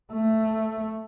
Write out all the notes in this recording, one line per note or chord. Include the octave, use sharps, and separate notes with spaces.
A3